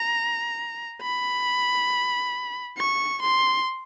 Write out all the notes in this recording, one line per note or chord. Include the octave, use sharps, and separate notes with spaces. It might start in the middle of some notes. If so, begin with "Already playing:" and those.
Already playing: A#5
B5
C#6
C6